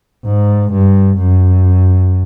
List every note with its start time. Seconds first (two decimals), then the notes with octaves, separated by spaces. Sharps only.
0.25 G#2
0.72 G2
1.17 F#2